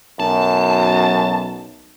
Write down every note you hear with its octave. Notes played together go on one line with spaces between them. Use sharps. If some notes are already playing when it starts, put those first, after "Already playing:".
B1 F#2 A5